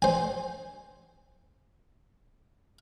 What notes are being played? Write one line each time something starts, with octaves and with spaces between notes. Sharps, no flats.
C5 G#5